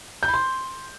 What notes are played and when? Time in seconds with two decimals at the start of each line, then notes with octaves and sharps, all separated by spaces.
0.23 G6
0.28 B5
0.34 C6